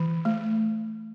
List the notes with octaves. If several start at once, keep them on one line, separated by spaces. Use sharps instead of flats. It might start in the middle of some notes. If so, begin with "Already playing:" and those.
Already playing: E3
A3